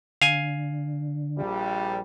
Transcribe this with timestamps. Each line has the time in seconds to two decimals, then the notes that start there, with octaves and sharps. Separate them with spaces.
0.22 D3 F5 G#5
1.37 A#1 G3